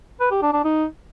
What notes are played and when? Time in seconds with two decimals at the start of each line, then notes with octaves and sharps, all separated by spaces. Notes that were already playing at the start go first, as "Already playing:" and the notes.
0.20 B4
0.31 G4
0.42 D4
0.53 D4
0.64 D#4